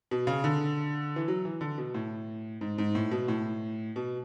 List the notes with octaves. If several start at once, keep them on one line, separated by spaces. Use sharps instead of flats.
B2
C#3
D3
E3
F#3
E3
D3
B2
A2
G#2
G#2
A2
B2
A2
B2